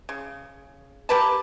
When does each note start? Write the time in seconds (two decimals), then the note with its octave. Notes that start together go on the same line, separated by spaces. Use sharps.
0.09 C#3
1.09 G4 A#4 B4 A5